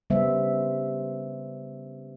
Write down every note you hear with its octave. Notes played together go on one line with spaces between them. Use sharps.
C#3 G3 B3 C5 E5